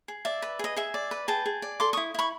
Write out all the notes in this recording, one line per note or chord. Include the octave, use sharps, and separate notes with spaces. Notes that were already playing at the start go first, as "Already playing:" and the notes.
G#4
D5 E5
B4
G#4 D#5
G#4 E5
D5
B4
G#4 G5 A5
G#4
D5
A4 C6 D6
E4 C#6 D#6
E4 B5 C#6